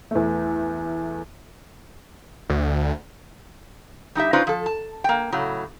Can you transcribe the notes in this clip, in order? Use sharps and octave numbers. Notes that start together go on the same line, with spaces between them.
E2 A3
D2
G3 D#4 G4 E5
C#4 D#4 F4 B4 C5 D5
F3 A4
A5
A#3 G5
A2 C#3 F#3